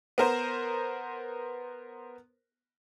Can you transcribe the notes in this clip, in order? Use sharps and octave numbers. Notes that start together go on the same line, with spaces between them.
B3 A#4 C5